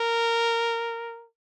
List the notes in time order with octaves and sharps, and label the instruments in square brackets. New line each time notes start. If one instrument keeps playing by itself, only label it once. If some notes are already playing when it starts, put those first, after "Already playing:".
Already playing: [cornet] A#4